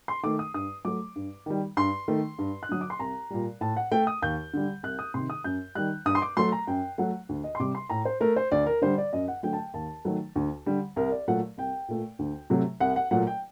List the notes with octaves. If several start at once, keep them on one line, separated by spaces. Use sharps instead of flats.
C6
D#3 A3 D6
D#6
G2 D#6
F#3 A3 D6
G2
D#3 G3
G2 C6
D#3 A3
G2
F#6
D3 F#3 D#6
D6
C6
C2 A#5
A#2 G3
A2 A5
F#5
A3 G5
D#6
D#2 G6
D3 G3
C2 F#6
D#6
C3 D#3 C6
D#6
F#2 G6
D#3 G3 F#6
G2 D#6
C6
D6
F#3 A3 C6
A#5
F#2 G5
F#3 A3 F#5
D2
D#5
C6
C3 G3 D6
C6
A2 A#5
C5
A3 A#4
C5
D2 D5
A#4
D3 G3 C5
D5
F#2 D#5
F#5
D3 F#3 A3 G5
A5
G5
D#2 A5
D#3 F#3 A3
D2
D3 G3
C2 A#4
D5
A#2 F#3 A3 F#5
C2 G5
A#2 A3
D2
C3 F#3 A3
C2 F#5
F#5
A#2 F#3 A3 F#5
G5